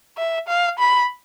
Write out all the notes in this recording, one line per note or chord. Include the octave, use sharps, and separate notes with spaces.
E5
F5
B5